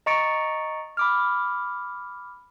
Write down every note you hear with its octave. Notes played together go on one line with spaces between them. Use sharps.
D#5 A#5 C#6 A6 C#7 D7
B5 D6 F6